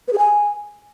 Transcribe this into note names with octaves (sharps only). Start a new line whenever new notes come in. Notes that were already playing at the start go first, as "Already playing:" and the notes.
B4
G#4
G#5